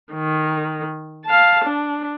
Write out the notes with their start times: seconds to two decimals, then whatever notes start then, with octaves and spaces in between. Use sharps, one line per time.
0.13 D#3
1.25 F5 A5
1.65 D4